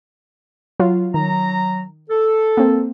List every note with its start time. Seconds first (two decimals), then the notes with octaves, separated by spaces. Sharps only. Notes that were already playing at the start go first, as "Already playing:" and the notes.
0.80 F#3 F4
1.14 D#3 F#3 A#5
2.10 A4
2.57 A#3 C4